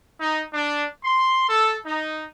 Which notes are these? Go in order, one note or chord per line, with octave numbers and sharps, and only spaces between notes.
D#4
D4
C6
A4
D#4